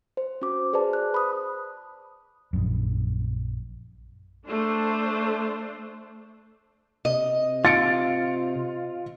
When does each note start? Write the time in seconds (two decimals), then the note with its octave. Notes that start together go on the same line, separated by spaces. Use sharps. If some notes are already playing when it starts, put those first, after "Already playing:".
0.17 C5
0.42 C#4 F#4 D6
0.73 G#4 B4 C5 D5 A5
0.93 F#6
1.14 B5 D#6
2.53 A#1 F#2
4.45 A3 D4 C5
7.05 C3 D#5
7.65 F4 A6 C#7 D7